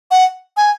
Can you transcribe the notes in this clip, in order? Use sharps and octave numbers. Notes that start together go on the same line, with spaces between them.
F#5
G#5